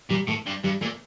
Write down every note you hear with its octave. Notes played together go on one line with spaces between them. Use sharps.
A#2 G3
A2 A3
G2
G2 G3
A#2 A3